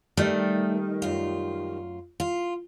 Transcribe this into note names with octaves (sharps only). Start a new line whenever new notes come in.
D#3 G3 A3
F#2 F4
F4